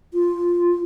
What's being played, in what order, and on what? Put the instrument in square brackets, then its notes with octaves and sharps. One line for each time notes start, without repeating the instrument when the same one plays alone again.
[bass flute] F4